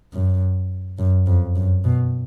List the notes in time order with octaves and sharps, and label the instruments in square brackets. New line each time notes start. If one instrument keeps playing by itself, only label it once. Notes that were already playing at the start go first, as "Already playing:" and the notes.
[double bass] F#2
F#2
F2
F#2
B2